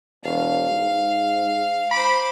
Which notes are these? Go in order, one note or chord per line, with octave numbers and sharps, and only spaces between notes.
E1 F5
G#2
C5 B5 D6